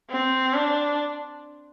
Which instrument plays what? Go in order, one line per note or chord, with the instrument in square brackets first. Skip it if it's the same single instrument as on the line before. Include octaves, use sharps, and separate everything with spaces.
[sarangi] C4
D4